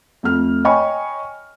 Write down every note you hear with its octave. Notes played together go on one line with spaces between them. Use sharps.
F2 A3 F6
C#5 D#5 G5 G#5 B5 C#6